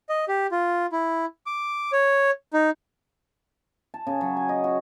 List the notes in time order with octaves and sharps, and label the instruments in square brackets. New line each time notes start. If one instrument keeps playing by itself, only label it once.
[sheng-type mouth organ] D#5
G4
F4
E4
D6
C#5
D#4
[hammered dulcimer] A5
C#3
F#3
G#5
D#5
F#4